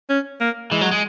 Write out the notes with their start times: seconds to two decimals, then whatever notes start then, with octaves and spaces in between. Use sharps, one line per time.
0.10 C#4
0.41 A#3
0.71 E3 G#3
0.81 F#3
0.91 G#3